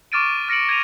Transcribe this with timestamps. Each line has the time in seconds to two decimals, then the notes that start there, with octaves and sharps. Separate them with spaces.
0.12 C#6 D6 F6 A6 D7 D#7
0.49 F6 A#6 C#7 D7 F#7
0.69 G#6 A#6 D#7 F7